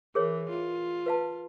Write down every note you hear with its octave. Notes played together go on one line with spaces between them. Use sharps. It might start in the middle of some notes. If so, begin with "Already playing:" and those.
E3 G#4 A#4 C#5
F4
B4 F5 A5